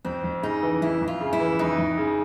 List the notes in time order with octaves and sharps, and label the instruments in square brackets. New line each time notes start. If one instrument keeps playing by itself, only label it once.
[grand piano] F2 [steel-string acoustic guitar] C4
[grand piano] F2
[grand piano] C#3 [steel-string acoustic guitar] D#4
[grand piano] E3
[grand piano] F2 [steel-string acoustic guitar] E4
[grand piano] F2
[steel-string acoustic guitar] F4
[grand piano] C#3
[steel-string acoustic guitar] E4
[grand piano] E3
[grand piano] F2 [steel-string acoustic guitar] D#4
[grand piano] F2
C#3